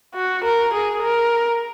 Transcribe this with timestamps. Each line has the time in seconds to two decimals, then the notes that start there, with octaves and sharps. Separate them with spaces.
0.15 F#4
0.44 A#4
0.73 G#4
1.03 A#4